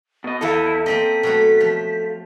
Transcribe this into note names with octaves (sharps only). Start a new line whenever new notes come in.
B2 D#5
E2 E4 A4 D#5 F5
A#3 C4 D#5 B6
B2 F#3 A3
F3